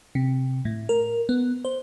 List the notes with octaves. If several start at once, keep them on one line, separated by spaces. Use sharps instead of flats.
C3
A2
A#4
B3
C5